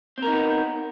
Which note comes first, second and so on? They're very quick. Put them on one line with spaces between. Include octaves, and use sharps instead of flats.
C4 A#4 D#4 B3